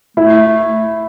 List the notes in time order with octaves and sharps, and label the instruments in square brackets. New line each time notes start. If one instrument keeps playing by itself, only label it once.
[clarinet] A3 [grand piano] E4 E5